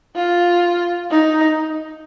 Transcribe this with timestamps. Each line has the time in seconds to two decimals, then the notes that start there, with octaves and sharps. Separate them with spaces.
0.16 F4
1.10 D#4